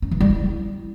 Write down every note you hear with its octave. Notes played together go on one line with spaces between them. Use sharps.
C#4
E3
G3
E4